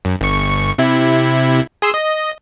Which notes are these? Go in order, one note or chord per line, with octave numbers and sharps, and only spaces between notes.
F#2
G1 C#6
C3 E4
G#4 C6 E6
D#5